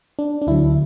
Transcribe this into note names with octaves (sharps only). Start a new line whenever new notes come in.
D4
D4
D2 D3 F#3 E4